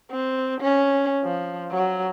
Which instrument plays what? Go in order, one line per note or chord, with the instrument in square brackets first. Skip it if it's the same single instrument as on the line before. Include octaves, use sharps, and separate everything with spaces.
[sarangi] C4
C#4
F3
F#3